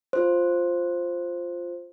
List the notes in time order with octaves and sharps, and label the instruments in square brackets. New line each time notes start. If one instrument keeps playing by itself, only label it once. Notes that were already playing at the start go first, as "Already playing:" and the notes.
[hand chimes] F4 C5